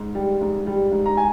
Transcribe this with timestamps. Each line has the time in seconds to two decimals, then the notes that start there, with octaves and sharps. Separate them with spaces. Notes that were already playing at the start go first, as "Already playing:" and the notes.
Already playing: G#2
0.15 G3
0.41 G#2
0.67 G3
0.92 G#2
1.06 A#5
1.17 G#5